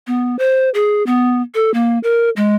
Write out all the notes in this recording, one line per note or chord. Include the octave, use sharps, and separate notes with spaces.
B3
C5
G#4
B3
A4
A#3
A#4
G#3